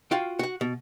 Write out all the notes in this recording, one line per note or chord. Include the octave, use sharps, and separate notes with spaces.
F4 F#4 F5 G5
F#4 F#5
B2